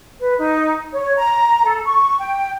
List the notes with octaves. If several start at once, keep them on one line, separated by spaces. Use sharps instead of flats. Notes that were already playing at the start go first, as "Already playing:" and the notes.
B4
D#4
C#5
A#5
A4
C#6
G5